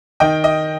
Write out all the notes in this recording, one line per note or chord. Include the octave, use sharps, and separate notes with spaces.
D#3 D#5 G5
D#5